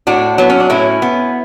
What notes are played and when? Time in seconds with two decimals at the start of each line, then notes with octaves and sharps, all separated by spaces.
0.07 A2 D4 F#4
0.38 F#3 B3
0.50 C#4
0.60 D4
0.70 A2 C#4 E4
1.02 B3